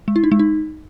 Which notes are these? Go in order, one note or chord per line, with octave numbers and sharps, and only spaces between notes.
G#3
E4
D#4
G#3
D#4